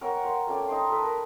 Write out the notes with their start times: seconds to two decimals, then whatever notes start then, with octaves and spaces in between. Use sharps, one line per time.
0.01 A#4 C#5 F#5 G5
0.24 C5 F5
0.47 A3 C#4 D5 G5
0.68 D#4 G5 C6
0.89 A4 B4
1.02 A#4